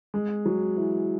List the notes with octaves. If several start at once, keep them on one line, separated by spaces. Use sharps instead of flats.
G#3
F#3
E3